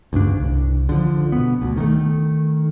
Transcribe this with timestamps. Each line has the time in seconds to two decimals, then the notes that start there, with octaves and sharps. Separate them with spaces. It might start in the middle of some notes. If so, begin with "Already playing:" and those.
0.13 D2 G2 C#3 D4
0.37 C2
0.89 D3 F3
1.32 B2 B3
1.62 D2
1.77 D#3 A3